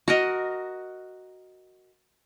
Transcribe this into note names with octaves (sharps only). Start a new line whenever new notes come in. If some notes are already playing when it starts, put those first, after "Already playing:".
F#4 A#4 D#5